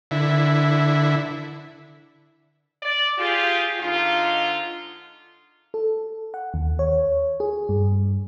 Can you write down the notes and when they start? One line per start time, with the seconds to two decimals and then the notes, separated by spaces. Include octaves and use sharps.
0.11 D3 E4
2.83 D5
3.19 F4 G4 G#4
3.80 G#2 D3 D#4 F4
5.74 A4
6.34 F#5
6.54 D#2
6.79 C#5
7.40 G#4
7.69 G2